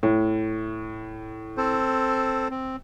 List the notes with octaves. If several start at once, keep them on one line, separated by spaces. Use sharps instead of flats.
A2
C4 A4 C5
C4